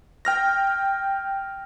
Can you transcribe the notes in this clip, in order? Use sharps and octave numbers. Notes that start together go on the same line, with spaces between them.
G5 F6 A#6